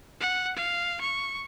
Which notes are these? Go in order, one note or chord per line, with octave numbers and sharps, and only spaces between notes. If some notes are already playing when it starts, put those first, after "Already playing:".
F#5
F5
C#6